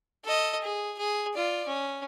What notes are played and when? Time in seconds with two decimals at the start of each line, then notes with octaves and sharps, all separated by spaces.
0.24 A4 D#5
0.62 G#4
0.99 G#4
1.34 F4 D5
1.67 C#4